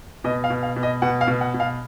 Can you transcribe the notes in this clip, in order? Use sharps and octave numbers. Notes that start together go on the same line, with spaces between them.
B2 D#5
F5
B2
F5
B2
D#5
B2 F#5
F5
B2
F#5
B2
F5